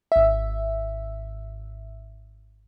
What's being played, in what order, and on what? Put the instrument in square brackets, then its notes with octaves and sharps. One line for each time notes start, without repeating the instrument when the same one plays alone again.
[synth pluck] G#1 E5